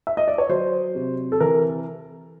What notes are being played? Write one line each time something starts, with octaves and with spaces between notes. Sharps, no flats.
E5
D#5
D5
C#5
F#3 C5
C3
A4
E3 A#4